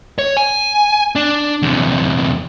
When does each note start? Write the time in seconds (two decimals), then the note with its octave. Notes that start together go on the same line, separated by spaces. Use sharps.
0.19 C#5
0.37 G#5
1.16 D4
1.62 E2 C3